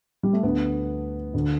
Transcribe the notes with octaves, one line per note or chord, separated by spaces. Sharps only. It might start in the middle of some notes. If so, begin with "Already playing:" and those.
G3
A3
D2 D3 B3
D2 D3